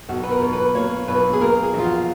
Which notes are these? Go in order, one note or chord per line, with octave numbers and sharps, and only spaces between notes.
B1 F#4
B4
A#4
B1
B4
A#3 C#5
B1 B4
G#4
A#3 A#4
G#4
A#1 F4
F#4